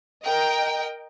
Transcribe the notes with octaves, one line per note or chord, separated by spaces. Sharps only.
A#4 D#5 G5